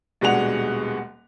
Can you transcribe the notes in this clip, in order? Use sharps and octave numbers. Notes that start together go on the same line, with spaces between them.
D#1 B2 G#3 D4 F#5 F7